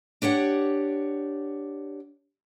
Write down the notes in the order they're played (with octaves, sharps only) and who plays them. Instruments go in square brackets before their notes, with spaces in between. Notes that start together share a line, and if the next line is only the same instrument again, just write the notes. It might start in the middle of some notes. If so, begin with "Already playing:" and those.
[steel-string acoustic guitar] D4 G4 C#5 F#5